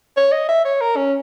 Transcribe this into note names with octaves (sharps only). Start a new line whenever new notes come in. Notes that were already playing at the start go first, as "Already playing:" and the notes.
C#5
D#5
E5
C#5
A#4
C#4